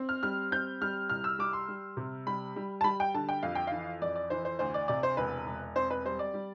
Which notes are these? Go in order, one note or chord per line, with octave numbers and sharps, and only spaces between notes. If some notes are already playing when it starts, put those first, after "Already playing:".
Already playing: C4
F6
G3 F6
C4 G6
G3 F6
C2 F6
E6
G3 D6
C6
G3
C3
G3 B5
G3
A5
G3 B5
G5
D3 A5
G5
F2 F5
G5
E3 F5
F2 D5
D5
E3 C5
C5
D2 C5
D5
C3 D5
C5
E1 B4
E1
C4 C5
B4
G3 C5
D5
G3